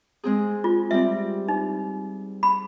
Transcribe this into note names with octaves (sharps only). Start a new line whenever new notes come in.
G#3 C4 G#4
F4
G3 C4 E5
D#4
B5